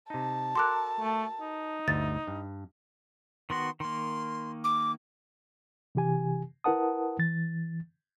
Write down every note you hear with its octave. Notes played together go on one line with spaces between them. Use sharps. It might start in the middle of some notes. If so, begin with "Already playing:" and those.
C3 D#4 A5
F#4 A4 A#4 C6 D6 F#6
A3
D#4
G1 D2 E5 A6
G2
D#3 B3 F#4 C6
D#3 A#3 C6
D6
C3 E3 G4 G#5
E4 A#4 B4 F#5 A5 D#6
E3 A6